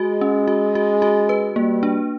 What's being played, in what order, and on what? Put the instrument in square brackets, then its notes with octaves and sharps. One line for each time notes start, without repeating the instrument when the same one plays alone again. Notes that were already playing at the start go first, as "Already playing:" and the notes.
Already playing: [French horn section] G#3 [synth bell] F#4
[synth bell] C#4
F#4
F#4
F#4
B4
[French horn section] G3 [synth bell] A#3
[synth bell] D4